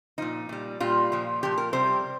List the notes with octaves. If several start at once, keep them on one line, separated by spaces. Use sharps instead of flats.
A#2 F3 D#4
A#2 G3
A#2 G3 F4
A#2 F3
A#2 F3 G4
A#4
C3 G3 C5